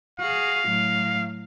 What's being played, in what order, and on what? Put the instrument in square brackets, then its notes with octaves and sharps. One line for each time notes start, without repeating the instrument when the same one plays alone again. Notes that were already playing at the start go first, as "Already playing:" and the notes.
[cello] F#4 G#4 [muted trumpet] F5
[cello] A2 F#3